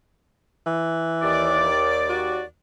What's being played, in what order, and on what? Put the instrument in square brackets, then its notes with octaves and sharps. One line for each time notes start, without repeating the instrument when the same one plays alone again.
[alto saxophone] E3
[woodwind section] D#2 D5
[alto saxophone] F#4